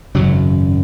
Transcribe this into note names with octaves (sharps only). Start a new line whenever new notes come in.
G#1 F#2 C#3 F#3